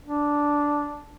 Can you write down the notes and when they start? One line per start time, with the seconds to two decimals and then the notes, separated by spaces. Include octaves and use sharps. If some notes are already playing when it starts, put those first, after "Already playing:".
0.05 D4